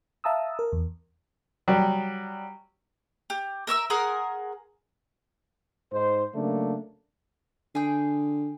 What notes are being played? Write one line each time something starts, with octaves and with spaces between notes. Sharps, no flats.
E5 F5 A5 A#5 D#6 E6
A#4
E2
F#3 G3
G4
A#4 E5 D6 E6
G#4 A#4 F#5 C6
G#2 D#4 C5
C#3 F#3 A3 A#3 D4
D3 G#4 G5